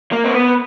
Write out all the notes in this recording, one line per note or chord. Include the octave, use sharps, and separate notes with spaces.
A#3
C4
B3